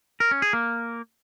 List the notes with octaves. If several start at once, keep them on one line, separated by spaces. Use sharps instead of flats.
A#4
C#4
G#4
A#3